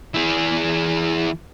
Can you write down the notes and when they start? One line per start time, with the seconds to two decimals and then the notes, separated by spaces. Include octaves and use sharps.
0.14 E3 G#4